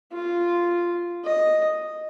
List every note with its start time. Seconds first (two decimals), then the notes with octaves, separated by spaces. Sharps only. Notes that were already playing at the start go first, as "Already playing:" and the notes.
0.13 F4
1.25 D#5